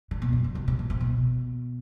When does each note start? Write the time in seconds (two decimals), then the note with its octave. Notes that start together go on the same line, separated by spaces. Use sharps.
0.11 D3
0.22 B2
0.33 F#2
0.44 D3
0.55 C3
0.68 C3
0.79 E3
0.90 C3
1.01 B2